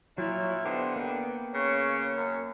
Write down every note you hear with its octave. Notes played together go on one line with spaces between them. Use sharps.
A#2 F#3 E4 C#5
D3 B3 G4 C5 D#5
A#3 G5
C#3 C#5
F#2